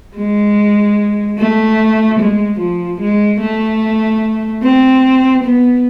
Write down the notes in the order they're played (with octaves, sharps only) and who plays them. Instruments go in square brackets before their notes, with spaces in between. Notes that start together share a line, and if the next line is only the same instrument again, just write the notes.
[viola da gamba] G#3
A3
G#3
F3
G#3
A3
C4
B3